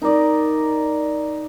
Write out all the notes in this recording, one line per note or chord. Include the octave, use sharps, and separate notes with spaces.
D#4 A#4 D5 D#5